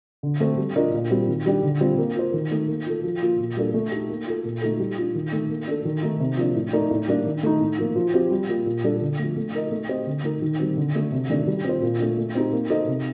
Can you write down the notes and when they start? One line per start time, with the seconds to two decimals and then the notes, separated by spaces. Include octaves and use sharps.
0.23 D3
0.40 A3 C4
0.58 G3
0.76 D4 F4 A#4 D#5
0.93 A#2
1.10 G3 C4
1.28 D#3
1.46 G3 D4 G4
1.63 D3
1.81 G3 C4 F4
1.98 A#3
2.16 F4 C5
2.34 D#3
2.51 A3 D#4
2.69 A#3
2.86 F4 A4
3.04 F3
3.22 A#3 F4
3.39 A#2
3.57 G3 A#3 D4 A4
3.74 A3
3.92 D#4 G4
4.09 A#3
4.27 F4 A4
4.44 A#2
4.62 A3 D#4 A4
4.80 G3
4.97 D4 F4
5.15 D#3
5.32 A3 D#4
5.50 A#3
5.67 D4 A4
5.85 D#3
6.03 A3 D#4
6.20 C3
6.37 F3 A#3 D4
6.55 A2
6.73 A3 D#4 A#4 D5
6.91 A2
7.08 G3 A#3 D4
7.26 D#3
7.43 A3 D#4
7.61 A2
7.78 F3 A#3 F4
7.96 F3
8.14 C4 G4
8.31 G3
8.49 A#3 F4
8.66 A#2
8.84 G3 D4 A4
9.01 D3
9.19 F3 A3
9.37 A3
9.54 D#4 A#4 D#5
9.72 A3
9.89 C4 G4 C5 D#5
10.07 D3
10.24 A3 D#4 A#4
10.42 D#3
10.59 G3 C4
10.77 D3
10.95 A3 D4 A4
11.12 C3
11.30 D#3 A3 D4
11.47 G3
11.65 C4 F4 C5
11.82 A#2
12.00 A3 D4
12.17 A3
12.35 C4 D#4 G4
12.53 A#3
12.70 D#4 A4 C5 D#5
12.88 C3